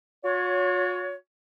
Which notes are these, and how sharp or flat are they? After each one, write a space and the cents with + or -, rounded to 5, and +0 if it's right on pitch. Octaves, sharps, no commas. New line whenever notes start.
F#4 -45 C#5 +20